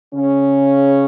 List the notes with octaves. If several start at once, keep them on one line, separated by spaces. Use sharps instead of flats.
C#3 C#4